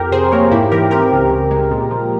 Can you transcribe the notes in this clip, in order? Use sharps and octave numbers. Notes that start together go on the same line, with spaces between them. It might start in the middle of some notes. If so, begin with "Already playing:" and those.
Already playing: F2 G4 A#4
C3 G#4 C5
A#3 A#4 C#5
G#2 E4 G4
E3 G4 A#4
C4 G4 A#4
C#2
C#3
G#3
A#2
F3